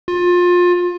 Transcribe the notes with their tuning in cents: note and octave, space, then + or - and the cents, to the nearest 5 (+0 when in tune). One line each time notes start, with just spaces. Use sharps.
F4 +25